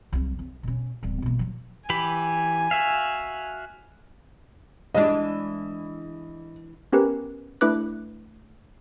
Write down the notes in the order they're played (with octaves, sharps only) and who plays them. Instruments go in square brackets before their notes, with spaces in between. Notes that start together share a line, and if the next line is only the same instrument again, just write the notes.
[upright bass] C2 F#3
C2
B2 C#4
D1 G3
B2 A#3
F3 F#3
[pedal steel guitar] E3 G4 B5 [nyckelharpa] G#5
[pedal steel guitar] F#4 E5 F5
[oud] E3 G#3 D4 [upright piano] D#5
[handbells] B3 C#4 G4 A#4 B4
A3 D4 E4 B4 D6 F#6